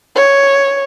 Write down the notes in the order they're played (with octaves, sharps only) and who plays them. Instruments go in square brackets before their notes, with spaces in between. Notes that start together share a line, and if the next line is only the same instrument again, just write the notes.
[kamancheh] C#5